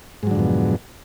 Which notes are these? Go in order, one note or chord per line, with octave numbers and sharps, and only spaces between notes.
F2 G#2 B2 D3 F#3